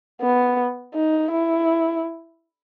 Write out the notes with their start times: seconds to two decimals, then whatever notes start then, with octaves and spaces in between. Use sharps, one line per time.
0.22 B3
0.95 D#4
1.31 E4